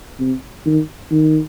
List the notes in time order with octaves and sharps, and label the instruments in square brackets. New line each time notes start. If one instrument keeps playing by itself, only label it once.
[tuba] C3
D#3
D#3